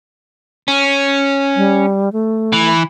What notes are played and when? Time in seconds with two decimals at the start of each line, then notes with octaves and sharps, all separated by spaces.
0.68 C#4
1.56 G3
2.13 A3
2.53 E3